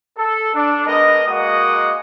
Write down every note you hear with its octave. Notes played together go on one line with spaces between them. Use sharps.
A4
D4
G#3 B3 A#4 D#5
G#3 A#3 F#4 D#5 F#5 D#6